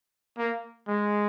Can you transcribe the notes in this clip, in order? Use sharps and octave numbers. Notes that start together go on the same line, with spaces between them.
A#3
G#3